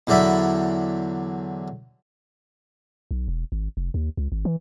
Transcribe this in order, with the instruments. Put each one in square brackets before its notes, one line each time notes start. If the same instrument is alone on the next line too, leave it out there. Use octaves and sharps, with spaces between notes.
[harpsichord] E2 D3 F#3 D5 E5 B5
[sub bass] B1
E1
G#1
F1
D#2
C#2
G#1
E3